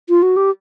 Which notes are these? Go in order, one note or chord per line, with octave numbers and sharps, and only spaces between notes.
F4
F#4
G4